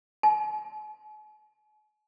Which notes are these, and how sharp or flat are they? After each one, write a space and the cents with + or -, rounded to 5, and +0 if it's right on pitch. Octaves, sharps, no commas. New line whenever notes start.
G#5 +40